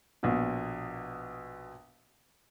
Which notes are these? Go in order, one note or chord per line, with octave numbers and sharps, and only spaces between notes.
A#1 B2